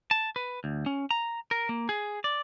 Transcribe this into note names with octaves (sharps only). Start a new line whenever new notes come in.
A5
B4
D2
C#4
A#5
A#4
A#3
G#4
D5